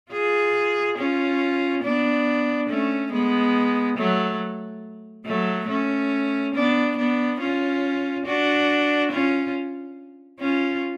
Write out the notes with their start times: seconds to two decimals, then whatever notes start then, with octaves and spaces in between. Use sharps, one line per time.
0.12 F4 G#4
0.98 C#4 F4
1.83 B3 D4
2.69 A3 C#4
3.12 G#3 B3
3.97 F#3 A3
5.26 F#3 A3
5.68 A3 C#4
6.54 B3 D4
6.97 B3 D4
7.40 C#4 F4
8.26 D4 F#4
9.11 C#4 F4
10.40 C#4 F4